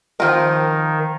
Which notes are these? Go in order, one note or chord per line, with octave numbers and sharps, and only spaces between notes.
D#3 F3 G#3 C4 F4 A#4